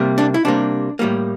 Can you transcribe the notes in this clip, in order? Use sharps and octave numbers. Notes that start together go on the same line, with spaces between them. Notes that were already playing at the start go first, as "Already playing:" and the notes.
Already playing: C3 G3 A#3
D4
E4
C3 G3 A#3 D4
A2 G3 A#3